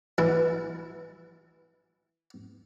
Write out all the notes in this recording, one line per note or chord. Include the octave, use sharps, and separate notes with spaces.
E3 E4